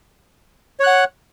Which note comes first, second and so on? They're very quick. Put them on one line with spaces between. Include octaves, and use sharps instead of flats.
C#5 F#6 F#5